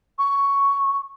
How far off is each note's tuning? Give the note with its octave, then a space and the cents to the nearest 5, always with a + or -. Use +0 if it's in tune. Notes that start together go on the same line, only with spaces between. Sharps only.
C#6 +5